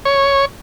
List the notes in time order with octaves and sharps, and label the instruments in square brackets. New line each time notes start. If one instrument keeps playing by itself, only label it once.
[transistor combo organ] C#5